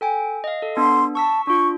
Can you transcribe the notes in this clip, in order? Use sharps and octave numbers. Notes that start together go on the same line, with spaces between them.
A4 G5 G#5
D#5 F5
A4
B3 D4 C6
A5 C#6 E6 B6
D4 F4 C#6